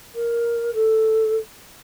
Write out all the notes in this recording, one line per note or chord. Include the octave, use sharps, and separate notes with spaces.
A#4
A4